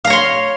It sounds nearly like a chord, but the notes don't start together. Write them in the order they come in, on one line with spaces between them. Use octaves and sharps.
F5 A#5 C#5 C6